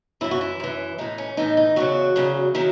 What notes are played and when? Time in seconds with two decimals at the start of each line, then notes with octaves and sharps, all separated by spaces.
0.21 F#2 E3 E4
0.31 F#4
0.41 E4
0.60 F#2 E3
0.98 A2 E3 D#4
1.18 C#4
1.37 A2 E3 D#4
1.57 D#4
1.76 E2 C#3 F#3 F#4
2.16 E2 C#3 F#3
2.54 D#3 F#3 E4